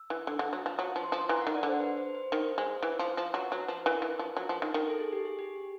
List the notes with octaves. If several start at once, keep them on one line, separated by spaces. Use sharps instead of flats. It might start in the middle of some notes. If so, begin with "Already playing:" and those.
Already playing: E6
E3
D3
D3
F#3
F3
F#3 D#6
F3
C6
F3
E3 A#5
F#5
D#3
D5
D3 C5
B4
C5
C5
D#3
G#3
E3
F3
F3
F#3 B4
F#3
B4
F3
E3 A#4
E3
F3
F#3
F3
D#3
D#3
A4
G#4
G4
G#4
G4